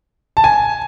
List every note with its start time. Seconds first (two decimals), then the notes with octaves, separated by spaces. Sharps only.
0.37 A5
0.44 G#5